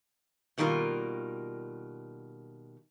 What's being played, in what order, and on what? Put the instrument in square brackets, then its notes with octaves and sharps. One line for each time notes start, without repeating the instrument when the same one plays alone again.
[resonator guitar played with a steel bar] B2 D#3 G3 A#3 F4